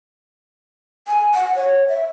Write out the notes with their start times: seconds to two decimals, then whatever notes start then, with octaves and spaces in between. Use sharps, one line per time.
1.08 G#5
1.34 F#5
1.55 C#5
1.88 E5